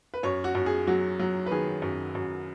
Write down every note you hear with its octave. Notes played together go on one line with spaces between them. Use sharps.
B4
F#2 C#5
F#4
F#2
G#4
F#3 F#4
F#3
B4
D#3 G#4
F#2
F#2